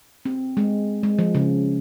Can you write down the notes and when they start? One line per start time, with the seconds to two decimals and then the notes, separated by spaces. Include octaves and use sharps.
0.25 C4
0.57 G#3
1.03 G#3
1.19 F3
1.35 C#3